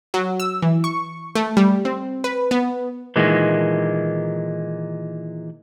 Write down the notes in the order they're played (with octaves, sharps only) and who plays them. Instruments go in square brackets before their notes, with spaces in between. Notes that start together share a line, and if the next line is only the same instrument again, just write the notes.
[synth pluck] F#3
E6
E3
C#6
A3
G3
C4
B4
B3
[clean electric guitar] A#2 D#3 E3 G#3